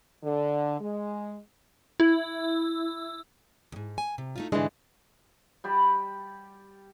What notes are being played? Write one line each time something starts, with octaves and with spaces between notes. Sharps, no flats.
D3
G#3
E4
D#2 G#2
G#5
C3
A3 D#4 F4
G#2 D3 E3 G#3 D4
G3 G4 D5